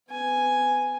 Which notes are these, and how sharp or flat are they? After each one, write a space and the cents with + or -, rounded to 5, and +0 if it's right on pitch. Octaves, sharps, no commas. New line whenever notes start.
B3 +35 G#5 +0